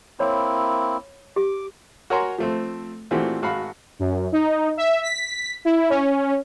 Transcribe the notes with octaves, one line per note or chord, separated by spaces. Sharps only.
A#3 C4 E4 C#5 B5
G4 D6
F#4 A#4 C#5 G#5 A#5 C6
F3 A3 C4
A#2 E3 A3 C4 F#4 G4
G#1 F#4 F5 F#5 B5
F#2
D#4
E5
B6
E4
C#4